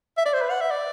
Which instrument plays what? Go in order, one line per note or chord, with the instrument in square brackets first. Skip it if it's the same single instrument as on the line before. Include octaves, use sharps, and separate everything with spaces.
[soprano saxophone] E5
D5
C5
B4
F#5
E5
D5